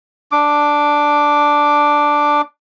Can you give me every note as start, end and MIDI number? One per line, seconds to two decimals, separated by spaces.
0.32 2.41 62
0.32 2.41 86